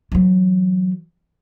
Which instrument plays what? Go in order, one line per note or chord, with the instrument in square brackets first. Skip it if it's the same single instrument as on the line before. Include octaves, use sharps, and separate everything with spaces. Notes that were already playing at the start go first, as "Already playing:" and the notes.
[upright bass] E3 F#3